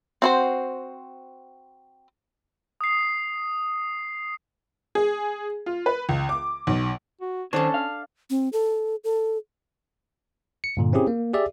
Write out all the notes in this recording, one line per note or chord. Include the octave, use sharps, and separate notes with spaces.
C4 F#4 C5
D#6 C7
G#4
F4
B4
C#2
D6
B1
F#4
D#3 C#4 D4 A4 C5 C#5
F5
C4
A4
A4
C#7
G2 A#2 D3
C4 C#4 E4 G4 G#4
A#3
G4 G#4 D5 E5